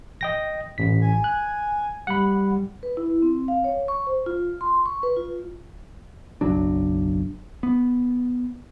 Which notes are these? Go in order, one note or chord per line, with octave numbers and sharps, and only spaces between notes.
D#5 G5 A#6
A1 B6
G#5
F#6
G3 F#5 B5
B4
E4
C4
F5
C#5
C#6
C5
F4
C6
C#6
B4
F4
F#1 B1 F#3 D4
B3